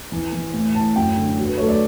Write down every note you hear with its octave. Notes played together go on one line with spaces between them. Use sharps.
E3
E3
A2
A2 A5
F#2 G5
D3
F#3
B4
A3 C#5
D5